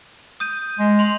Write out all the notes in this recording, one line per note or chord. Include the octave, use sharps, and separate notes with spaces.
D#6 G6 D#7
G#3
C6 F7